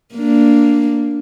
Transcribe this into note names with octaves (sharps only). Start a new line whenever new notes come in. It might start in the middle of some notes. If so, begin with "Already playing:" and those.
A#3 D4